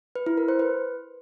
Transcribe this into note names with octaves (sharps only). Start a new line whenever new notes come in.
B4
E4
A#4
C5
B4